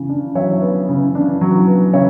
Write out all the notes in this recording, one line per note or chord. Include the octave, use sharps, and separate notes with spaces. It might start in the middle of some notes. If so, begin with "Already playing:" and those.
Already playing: C#3
D4
F#3 C#5 E5
B3
C#3
D4
F#3
B3
C#3 C#5 E5